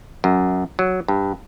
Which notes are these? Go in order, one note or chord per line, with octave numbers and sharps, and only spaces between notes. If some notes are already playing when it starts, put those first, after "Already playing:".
F#2
F#3
G2